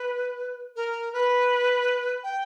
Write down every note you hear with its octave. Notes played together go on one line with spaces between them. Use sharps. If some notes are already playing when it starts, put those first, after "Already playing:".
Already playing: B4
A#4
B4
G5